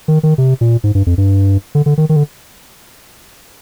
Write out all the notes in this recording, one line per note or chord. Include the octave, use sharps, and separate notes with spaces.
D#3
D#3
C3
A#2
G#2
G2
F2
G2
D3
D3
D#3
D#3
D3